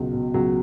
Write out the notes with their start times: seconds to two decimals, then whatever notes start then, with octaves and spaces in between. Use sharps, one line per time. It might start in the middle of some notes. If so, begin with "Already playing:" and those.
Already playing: C#2 B2 F#3
0.13 B2
0.34 C#2 F#3